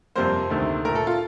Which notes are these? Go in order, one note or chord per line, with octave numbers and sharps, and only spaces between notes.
F2 C3 G3 A#3 C5
D2 C3 D#3 A3
A#2 A3 A#4
A4
F4